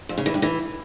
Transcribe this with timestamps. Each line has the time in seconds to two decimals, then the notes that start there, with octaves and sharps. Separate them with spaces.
0.09 F2
0.18 C#3
0.26 E3
0.34 G2
0.42 E3